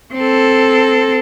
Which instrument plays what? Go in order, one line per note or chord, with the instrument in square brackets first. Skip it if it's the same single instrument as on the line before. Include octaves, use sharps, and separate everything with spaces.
[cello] C4 A4